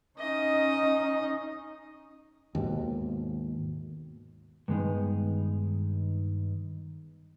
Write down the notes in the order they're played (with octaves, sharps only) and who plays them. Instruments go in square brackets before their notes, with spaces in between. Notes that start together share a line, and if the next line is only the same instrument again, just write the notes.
[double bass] C#4 D#4 [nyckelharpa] D#5
[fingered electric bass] D#2 G#2 B2
[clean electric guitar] G2 D#3 G#3 B3 D#4